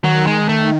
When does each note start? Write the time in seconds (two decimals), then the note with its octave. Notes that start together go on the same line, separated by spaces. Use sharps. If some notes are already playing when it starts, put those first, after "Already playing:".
0.04 D#3 F#3
0.27 G#3
0.49 A3